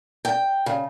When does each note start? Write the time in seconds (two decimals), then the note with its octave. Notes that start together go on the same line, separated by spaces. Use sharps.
0.25 G5
0.66 C#3